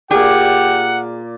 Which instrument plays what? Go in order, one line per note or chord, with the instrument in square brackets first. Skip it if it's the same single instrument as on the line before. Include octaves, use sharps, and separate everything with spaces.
[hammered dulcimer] A#2 D5 [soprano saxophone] G4 [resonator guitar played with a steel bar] G#4 [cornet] F#5